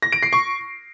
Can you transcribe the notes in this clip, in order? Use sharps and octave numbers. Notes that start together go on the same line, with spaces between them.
A#6
D7
C7
C#6